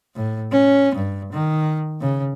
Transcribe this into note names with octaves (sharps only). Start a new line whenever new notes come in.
A2
C#4
G2
D#3
C#3